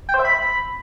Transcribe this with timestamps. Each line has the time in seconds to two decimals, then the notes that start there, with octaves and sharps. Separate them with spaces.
0.09 G5
0.14 C5
0.19 E5
0.25 B5